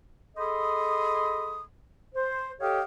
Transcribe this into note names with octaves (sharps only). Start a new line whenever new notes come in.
G#4 A4 D#5 B5 C6 D#6
C5
G4 A4 C#5 D#5 F5 G5